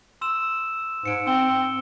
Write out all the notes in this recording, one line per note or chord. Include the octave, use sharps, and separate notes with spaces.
C6 E6 E7
G#2 C#7 D7
C4 E6 G7